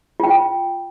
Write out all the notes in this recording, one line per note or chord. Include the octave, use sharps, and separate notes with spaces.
F4 G5